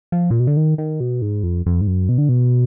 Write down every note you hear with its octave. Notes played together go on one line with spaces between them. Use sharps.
F3
A#2
B2
D3
D#3
D#3
B2
G#2
F2
F2
G#2
F#2
B2
D3
B2